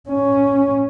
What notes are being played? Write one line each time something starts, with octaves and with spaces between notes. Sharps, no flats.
C#4